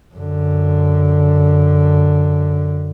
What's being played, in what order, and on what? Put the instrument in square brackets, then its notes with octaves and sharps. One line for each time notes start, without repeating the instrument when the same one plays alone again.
[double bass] F#2 D3